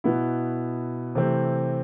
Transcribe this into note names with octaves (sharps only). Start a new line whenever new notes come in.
B2 B3 E4
C3 E3 A3 C4